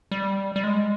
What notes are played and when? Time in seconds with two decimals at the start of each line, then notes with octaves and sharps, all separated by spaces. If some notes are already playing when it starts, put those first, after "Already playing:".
0.11 G3
0.56 G3
0.64 G#3